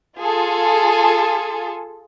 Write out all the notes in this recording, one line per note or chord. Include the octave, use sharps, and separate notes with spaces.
F4 G#4 A4